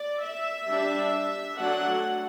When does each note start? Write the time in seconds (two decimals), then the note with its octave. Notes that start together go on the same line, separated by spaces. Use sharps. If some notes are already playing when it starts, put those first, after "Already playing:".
Already playing: D5
0.23 E5
0.68 G3 D4
1.58 F#3 A3 D4 F#5